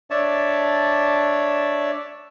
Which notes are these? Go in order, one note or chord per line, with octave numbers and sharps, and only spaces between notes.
D4 C#5 D5 E5 A5